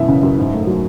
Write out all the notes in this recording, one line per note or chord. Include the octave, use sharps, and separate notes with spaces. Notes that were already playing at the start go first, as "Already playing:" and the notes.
Already playing: F#2 B2 E3 E5
C#3
F#2
G#2
A3
F#3